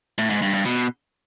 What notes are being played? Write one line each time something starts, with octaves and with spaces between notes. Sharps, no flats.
A2
G#2
G2
G2
B2